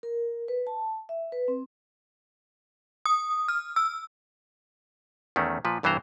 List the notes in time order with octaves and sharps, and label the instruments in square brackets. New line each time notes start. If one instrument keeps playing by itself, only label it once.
[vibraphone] A#4
B4
A5
E5
B4
C4
[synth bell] D#6
F6
E6
[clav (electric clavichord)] E2 D#3 A3 C#4
A#2 F3 B4
C2 G2 E3 B3 C5 A#5